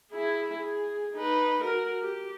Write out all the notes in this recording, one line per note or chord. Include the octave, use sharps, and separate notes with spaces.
E4 G#4
G#4
D#4 B4
F#4 A#4
G4